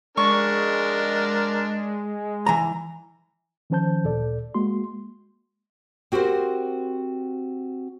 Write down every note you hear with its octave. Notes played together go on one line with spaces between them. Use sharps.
G#3 D4 A#4 C#6
E3 A#5
D#3 F3 C#4 C5 A5 G6
D2 A#2 A4 D5
G#3 A#3 F#4 C6
C4 F#4 G4 A#4 C5